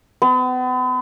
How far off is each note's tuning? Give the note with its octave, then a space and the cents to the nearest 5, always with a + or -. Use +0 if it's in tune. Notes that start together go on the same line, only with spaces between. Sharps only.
B3 +40